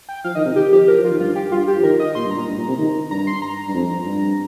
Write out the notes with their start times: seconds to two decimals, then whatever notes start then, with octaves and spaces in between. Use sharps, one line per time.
0.09 G5
0.24 F3 F5
0.35 D#3 D#5
0.45 C3
0.56 D#3 G4
0.72 F3 G4
0.88 F3 A#4
0.99 F3
1.05 F4
1.10 D#3
1.20 G2 F4
1.36 G4
1.52 G2 F4
1.68 G4
1.79 F3
1.83 D#3 A#4
2.00 D#5
2.15 A#2 C6
2.26 G2
2.31 A#2 A#5
2.47 G2
2.58 A#2
2.68 C3
2.79 D#3
3.11 G2 A#5
3.27 C6
3.42 A#5
3.68 G2
3.75 F2
4.06 G2